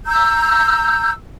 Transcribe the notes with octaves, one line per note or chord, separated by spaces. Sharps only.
A#5 E6 G6